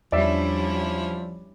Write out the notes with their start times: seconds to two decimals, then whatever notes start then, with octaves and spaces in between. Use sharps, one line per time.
0.12 E2 F3 G3 C#4 D4 E4 D5 E5